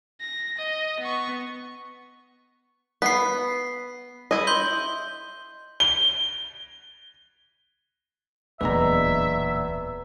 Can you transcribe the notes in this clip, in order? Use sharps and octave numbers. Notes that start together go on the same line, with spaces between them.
A#6
D#5
B3 C#6
B3 B6 C7
E4 D#5
C6 G6 G7
G7
D1 E2 A#2 D4 B4 D#5 E5 A#5